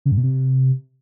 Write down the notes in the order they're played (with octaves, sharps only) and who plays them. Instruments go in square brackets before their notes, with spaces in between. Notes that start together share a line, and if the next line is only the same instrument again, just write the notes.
[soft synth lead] C#3
G2
B2
C3